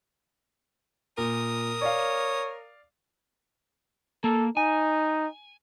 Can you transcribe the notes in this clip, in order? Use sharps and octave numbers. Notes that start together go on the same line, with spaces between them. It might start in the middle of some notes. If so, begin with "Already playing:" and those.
A#2 A#4 D#6
C#5 D5 F5
A#3 A4
D#4 G#5